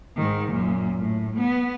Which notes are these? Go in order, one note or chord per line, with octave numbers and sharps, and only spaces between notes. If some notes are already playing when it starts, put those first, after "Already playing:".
G#2 D#3
F#2 A#2
A2
B3